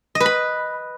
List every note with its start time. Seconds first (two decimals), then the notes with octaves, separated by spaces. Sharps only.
0.15 D#5
0.20 B4
0.26 B5